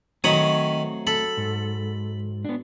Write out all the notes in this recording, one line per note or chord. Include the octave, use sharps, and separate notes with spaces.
D#3 F#3 A3 C4 C#5 B5 D#6
A4 B5
G#2
B3 D4